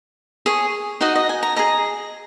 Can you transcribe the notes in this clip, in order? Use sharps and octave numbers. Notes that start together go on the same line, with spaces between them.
G#4 C#5
D#4 F#4 D#5 F#5
D#5
G#5
A#5
G#4 D#5 A#5